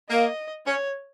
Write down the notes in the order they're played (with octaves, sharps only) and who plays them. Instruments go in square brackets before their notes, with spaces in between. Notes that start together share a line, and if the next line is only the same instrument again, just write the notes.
[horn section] A#3 [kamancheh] D#5
[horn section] C#4 [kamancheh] C#5